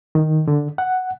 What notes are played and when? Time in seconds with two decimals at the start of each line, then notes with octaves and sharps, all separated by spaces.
0.15 D#3
0.48 D3
0.78 F#5